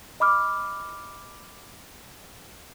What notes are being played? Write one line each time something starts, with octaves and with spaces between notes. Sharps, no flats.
D#5 B5 D6 F6